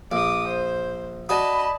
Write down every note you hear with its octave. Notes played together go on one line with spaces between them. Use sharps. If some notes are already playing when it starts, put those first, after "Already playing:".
A#1 D6 D#6
C5
F#4 D5 D#5 A5 B5 D#6